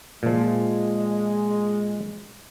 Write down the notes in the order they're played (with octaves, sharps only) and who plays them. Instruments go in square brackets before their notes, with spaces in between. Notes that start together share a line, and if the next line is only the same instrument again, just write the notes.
[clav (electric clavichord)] A#2 F3 [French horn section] G#3